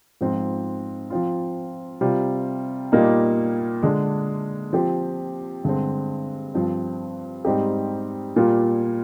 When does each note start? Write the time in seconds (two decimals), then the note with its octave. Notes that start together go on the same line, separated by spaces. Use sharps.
0.21 G#2 F3 C4 F4
1.10 F3 C4 F4
2.01 C3 G3 C4 F4
2.92 A#2 G3 A#3 D#4
3.83 D3 G#3 D4
4.73 F3 C4 G4
5.65 G2 D3 G#3 C4
6.55 G2 F3 C4
7.45 G#2 G3 C4 D#4 G4
8.36 A#2 G3 A#3 F4